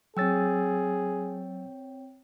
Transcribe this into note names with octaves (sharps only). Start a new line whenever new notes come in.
F#3 C4 G#4 C#5 G5 E6 A6